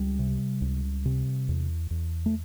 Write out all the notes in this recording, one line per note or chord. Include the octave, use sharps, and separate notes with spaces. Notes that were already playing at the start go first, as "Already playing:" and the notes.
Already playing: C#2 G3
C3
C#2
C3
E2
E2
A3